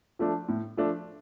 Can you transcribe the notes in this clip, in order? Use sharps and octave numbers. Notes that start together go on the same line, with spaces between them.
F3 A3 D4
A2
F3 A3 D4